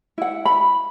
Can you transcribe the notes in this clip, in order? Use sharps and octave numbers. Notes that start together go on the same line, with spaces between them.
E4 F#5
B5